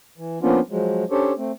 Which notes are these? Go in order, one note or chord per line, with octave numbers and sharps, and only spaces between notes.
E3
F3 A#3 B3 C#4 D4 F4
F3 F#3 G#3
C#4 D4 G4 A4 C5 C#5
A3 C4